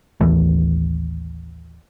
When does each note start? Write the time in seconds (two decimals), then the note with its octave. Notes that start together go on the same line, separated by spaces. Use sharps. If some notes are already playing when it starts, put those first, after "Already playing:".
0.21 A1 D#2 E3 A3